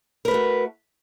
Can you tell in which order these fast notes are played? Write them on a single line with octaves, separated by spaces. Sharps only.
A#4 B4 A3 F#4